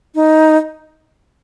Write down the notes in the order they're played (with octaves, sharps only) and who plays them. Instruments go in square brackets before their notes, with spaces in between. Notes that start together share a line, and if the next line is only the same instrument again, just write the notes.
[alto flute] D#4